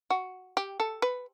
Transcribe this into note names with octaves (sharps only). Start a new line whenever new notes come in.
F#4
G4
A4
B4